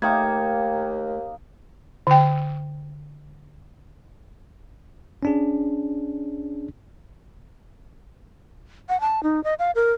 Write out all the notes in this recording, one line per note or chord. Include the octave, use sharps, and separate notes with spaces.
D#2 A3 A#3 D#4 G5 A#5 G#6
D3 G5
C#4 D4 G#4
F#5
A5
D#4
D#5
F5
A#4